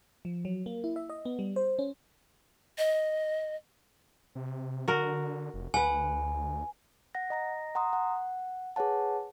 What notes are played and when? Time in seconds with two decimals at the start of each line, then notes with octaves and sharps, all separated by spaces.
0.25 F3
0.45 F#3
0.66 A#3
0.84 E4
0.96 E5
1.10 D#5
1.25 B3
1.39 G3
1.56 C5
1.79 C#4
2.78 D#5
4.35 C3
4.88 D3 F#4 A#4
5.54 F1
5.74 D2 B4 F#5 G#5
7.15 F#5 A#6
7.30 D#5 A#5 A#6
7.75 F#5 A#5 C6 D#6
7.93 F#5
8.76 G#4 B4 C#5 F#5 A5